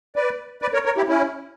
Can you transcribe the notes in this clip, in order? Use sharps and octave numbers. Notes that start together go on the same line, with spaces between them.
B4 D5
B4 D5
A#4 C#5
A#4 C#5
E4 G4
C#4 E4